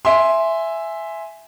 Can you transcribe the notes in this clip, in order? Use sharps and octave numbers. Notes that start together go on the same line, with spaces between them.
E5 G#5 C6